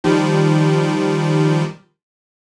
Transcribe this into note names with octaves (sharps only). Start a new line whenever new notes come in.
D#3 F3 G3